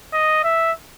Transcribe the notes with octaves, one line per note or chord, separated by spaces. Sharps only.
D#5
E5